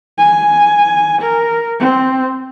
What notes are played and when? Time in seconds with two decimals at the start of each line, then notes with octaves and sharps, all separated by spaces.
0.18 G#5
1.21 A#4
1.79 C4